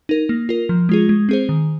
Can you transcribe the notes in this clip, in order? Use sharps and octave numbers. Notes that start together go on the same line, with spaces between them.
D#4 A#4
A#3
F4 A#4
F3
G#3 F4 G#4
G#3
C4 G#4 C5
D#3